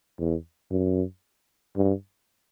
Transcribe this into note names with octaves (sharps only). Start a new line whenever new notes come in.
E2
F#2
G2